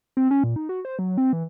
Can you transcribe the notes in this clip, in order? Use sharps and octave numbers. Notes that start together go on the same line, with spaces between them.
C4
C#4
A#2
D#4
F#4
C5
F#3
C4
E3